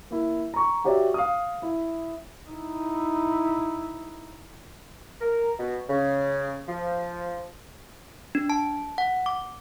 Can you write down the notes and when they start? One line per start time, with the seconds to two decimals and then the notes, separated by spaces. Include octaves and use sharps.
0.11 A#3 E4
0.54 A#5 C#6
0.84 F#4 G4 C#5 D5 E5
1.14 F5 D#6
1.62 E4
2.49 D#4 E4
5.21 A#4
5.59 B2
5.90 C#3
6.68 F3
8.35 D4
8.50 A5
8.98 F#5
9.26 D6